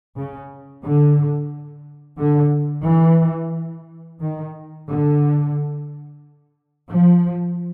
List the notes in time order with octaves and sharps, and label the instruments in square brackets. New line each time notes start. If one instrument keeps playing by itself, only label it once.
[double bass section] C#3
D3
D3
E3
D#3
D3
F3